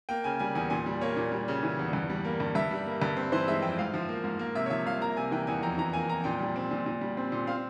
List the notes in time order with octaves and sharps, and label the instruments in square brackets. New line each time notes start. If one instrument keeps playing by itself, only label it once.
[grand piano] A#3 G5
C#3 G#5
G3 G#5
E2 G#5
A#2 G#5
G3
A#3 C#5
A#2
G3
C#3
E3
E2
G2
G3
A#3
G2
G2 E5
G3
A#3
G2
C4
E3 C5
G#3 E5
F2 G5
G#2 F5
F3
A#3
G#2
A#3
C3 E5
C#5
F3 E5
C2 F5
A#3 A#5
C3 G#5
E3 G5
E2 G#5
F2 A#5
E3 A#5
A#3 G#5
F2 A#5
A#2 G5
G3
C4
A#2
A#2
G3
C4
A#2
C4 F5